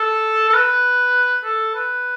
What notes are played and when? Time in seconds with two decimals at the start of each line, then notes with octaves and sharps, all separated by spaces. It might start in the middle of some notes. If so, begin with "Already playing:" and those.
Already playing: A4
0.49 A4
0.54 B4
1.45 A4
1.75 B4